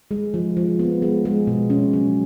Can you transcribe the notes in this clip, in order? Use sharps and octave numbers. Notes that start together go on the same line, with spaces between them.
G#3
F3
F3
B3
G#3
G#3
B2
C#4
F#3